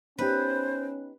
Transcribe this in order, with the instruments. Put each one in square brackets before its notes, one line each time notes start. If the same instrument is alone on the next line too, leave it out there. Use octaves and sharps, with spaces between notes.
[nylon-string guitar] B3 D#4 G4 [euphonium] C#4 [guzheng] B4 [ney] C5